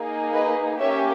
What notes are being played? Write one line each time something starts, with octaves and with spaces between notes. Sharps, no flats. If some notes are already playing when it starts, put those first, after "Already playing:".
Already playing: A#3 D#4 G#4
B4 D#5
A#3 C#4 G4 C#5 E5